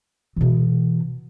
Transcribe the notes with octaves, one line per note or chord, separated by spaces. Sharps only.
B2 E3